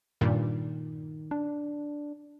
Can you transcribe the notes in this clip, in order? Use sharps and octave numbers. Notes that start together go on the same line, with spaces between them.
G2 A#2 D#3
D4